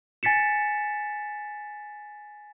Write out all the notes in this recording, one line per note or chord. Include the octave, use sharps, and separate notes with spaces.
G#5 A6 B6 C#7 E7